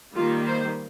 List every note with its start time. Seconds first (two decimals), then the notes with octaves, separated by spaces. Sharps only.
0.15 D#3 G3 A#3 F4
0.47 C5